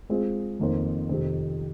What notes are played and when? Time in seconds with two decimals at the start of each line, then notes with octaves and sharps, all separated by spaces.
0.09 G#3 C4 F4 G#4
0.60 F2 D#3 A#3 D#4 C5
1.09 F2 C3 D#3 C4